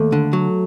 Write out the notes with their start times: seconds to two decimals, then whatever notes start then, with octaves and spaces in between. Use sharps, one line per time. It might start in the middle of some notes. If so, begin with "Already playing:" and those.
Already playing: D#2 A3
0.12 D3
0.33 F#3